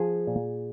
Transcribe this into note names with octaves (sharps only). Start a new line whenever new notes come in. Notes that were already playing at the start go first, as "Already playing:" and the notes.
Already playing: F3 G#4
A#2